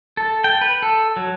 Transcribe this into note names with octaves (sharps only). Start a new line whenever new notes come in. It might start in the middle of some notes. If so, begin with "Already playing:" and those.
A4
G5
B4
A4
F#3